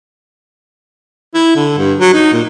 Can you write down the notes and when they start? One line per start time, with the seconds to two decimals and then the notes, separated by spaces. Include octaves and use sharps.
1.35 E4
1.56 D3
1.78 G2
2.00 F#3
2.14 D#4
2.33 A#2